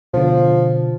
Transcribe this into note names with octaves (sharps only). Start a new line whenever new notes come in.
B2 D3 F3